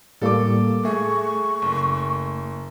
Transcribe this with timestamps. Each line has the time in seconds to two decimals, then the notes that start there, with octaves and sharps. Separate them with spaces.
0.22 A2 G3 A#3 A4 D6
0.85 A3 G#4 C#6
1.62 F#1